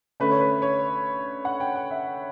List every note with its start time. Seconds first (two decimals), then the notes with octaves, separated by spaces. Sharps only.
0.20 D3 A3 C#4 B4
0.31 C#5
0.41 B4
0.62 C#5
1.45 F#5
1.60 G5
1.75 G5
1.91 E5